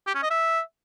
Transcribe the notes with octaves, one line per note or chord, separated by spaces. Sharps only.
G4
C#4
D#5
E5